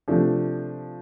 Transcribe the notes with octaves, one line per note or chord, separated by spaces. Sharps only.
C3 F3 A3 D4